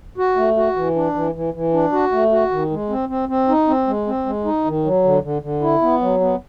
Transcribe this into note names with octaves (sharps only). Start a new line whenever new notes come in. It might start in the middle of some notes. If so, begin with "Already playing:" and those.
F#4
A3
F#4
E3
D4
E3
E3
E3
D4
F#4
A3
F#4
D#3
G#3
C4
C4
C4
D#4
C4
G#3
C4
G#3
D#4
D#3
F#3
D3
D3
D3
E4
B3
F#3
B3